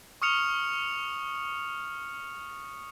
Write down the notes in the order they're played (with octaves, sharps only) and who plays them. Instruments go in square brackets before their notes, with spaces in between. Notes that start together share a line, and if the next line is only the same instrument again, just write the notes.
[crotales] C#6 D#6 F6 C#7 F7